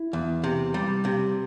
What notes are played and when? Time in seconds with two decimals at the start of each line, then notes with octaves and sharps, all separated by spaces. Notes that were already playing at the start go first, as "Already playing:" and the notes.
Already playing: E4
0.13 E2
0.44 C3
0.74 G3
1.05 C3